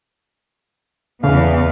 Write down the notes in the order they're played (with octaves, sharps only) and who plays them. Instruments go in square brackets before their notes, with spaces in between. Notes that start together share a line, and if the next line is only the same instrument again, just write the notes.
[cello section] E2 B3 [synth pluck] C#3 [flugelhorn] F5